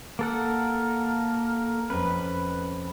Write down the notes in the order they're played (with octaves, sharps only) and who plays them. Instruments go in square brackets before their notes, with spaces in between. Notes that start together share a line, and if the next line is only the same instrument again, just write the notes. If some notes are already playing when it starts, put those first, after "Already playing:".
[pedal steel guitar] A#3 A4 F#5 [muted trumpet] A#4
[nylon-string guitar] F2 C#4 [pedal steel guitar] B4